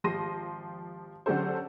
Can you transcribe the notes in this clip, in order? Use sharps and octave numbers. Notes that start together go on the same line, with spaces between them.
G#1 F3 G4 C6 A#6 D#7
D3 F#3 C#4 G4 A4 C5